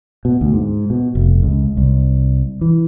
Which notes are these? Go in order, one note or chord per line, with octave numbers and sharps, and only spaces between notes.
B2
D2
G#2
B2
F1
C#2
C2
E3